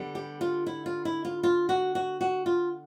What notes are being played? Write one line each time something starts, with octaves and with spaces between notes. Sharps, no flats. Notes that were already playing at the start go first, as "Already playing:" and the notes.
Already playing: D3 G3 B3
G4
F4
E4
F4
E4
F4
F4
F#4
F#4
F#4
F4